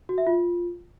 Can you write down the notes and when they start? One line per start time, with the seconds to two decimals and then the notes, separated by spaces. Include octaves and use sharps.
0.09 F#4
0.18 E5
0.27 F4